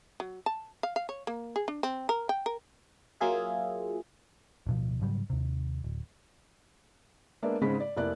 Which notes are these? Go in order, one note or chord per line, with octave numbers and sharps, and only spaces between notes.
F#3
A5
F5
F5
C#5
A#3
G#4
D4
C4
A#4
G5
A#4
F#3 A#3 F4 G#4 E5
D1 B2 F3
G#2 C#3 F#3 G3
D#2 C3
D1
G#3 A#3 B3 D4 D5 E5
G#2 C#3 G#3 C4 B5 B6
D5
F1 A#3 E4 D5 F#6